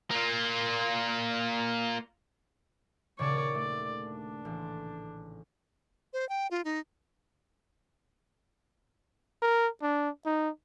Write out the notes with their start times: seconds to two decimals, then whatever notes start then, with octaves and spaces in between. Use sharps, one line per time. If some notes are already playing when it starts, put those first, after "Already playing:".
0.11 A#3 F4
3.19 D#1 C#3 C#5 D5 A5
3.55 A3 D5
4.07 D4
4.45 A1
6.13 C5
6.29 G5
6.51 F4
6.65 D#4
9.42 A#4
9.82 D4
10.26 D#4